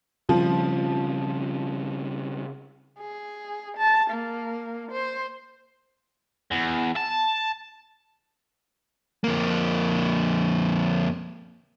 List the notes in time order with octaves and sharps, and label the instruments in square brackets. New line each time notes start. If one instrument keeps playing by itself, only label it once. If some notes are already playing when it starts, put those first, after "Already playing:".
[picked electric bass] C#3 G3 C4 [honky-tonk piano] F3
[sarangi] G#4
A5
A#3
C5
[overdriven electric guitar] E2
A5
[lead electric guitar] F2 A#3